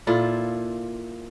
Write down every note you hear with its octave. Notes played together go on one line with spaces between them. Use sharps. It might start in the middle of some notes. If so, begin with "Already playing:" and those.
A#2 E4 F4 A4